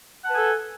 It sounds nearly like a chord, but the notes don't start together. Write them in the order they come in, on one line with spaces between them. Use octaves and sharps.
F#5 A5 B4 G#5 A4